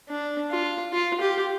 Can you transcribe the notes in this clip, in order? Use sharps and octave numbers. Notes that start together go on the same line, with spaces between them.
D4
F4
F4
G4